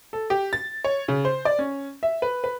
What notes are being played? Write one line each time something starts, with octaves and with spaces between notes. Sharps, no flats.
A4
G4
A6
C#5
C#3
C5
D5
C#4
E5
B4
B4